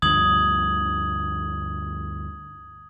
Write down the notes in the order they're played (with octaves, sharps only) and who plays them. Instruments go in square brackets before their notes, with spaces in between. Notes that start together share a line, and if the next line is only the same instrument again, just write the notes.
[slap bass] D2 G2 F3 [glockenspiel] D#6 G#6 F#7